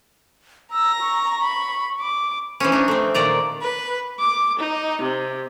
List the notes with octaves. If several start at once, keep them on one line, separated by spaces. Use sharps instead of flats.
A#5 E6 A#6
C#6
B5
D6
E3 C4 C#4
D4 D#4
A3 C4
A#2 D#3 D5 A#5
B4
D6
D#4
C3